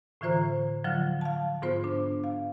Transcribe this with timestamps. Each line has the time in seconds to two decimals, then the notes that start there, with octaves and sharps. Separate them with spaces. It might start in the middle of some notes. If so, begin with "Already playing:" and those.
0.21 A2 D3 E3 F4 C5 A#5
0.84 D3 F3 F#3 F4 F6
1.21 F5 A5
1.62 G#2 B3 F4 C5
1.84 D4
2.24 F5